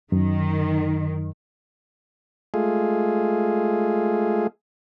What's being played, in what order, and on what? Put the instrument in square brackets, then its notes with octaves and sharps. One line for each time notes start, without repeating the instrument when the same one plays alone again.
[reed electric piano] F#2 [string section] D#3
[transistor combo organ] G#3 A3 F4 G#4